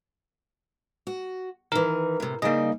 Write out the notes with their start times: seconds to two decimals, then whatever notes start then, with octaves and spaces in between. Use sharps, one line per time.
1.07 F#4
1.72 D#3 E3 A#4
2.20 A2 C3
2.42 C#3 G3 A#3 D#4 D#5